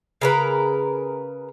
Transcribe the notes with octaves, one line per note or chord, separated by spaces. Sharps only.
C#3 A#4 B4